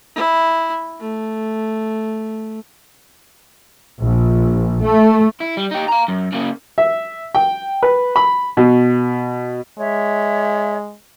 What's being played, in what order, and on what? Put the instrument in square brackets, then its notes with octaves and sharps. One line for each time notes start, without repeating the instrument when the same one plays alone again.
[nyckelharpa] E4
A3
[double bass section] A#1
A3
[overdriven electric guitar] E4
G3
D#4 G4
F5 A#5
F#2
C#3 A#3
[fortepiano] E5
G5
B4
B5
B2
[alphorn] G#3 [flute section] C#5 E5